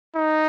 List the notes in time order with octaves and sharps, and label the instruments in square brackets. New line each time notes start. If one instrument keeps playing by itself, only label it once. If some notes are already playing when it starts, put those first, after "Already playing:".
[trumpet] D#4